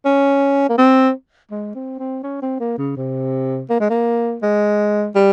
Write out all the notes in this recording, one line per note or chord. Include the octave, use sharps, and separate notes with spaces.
C#4
A#3
C4
G#3
C4
C4
C#4
C4
A#3
C#3
C3
A#3
G#3
A#3
G#3
G3